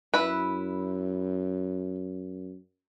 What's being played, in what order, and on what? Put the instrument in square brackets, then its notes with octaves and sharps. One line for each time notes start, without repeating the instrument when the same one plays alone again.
[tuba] F#2 [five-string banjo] E4 B4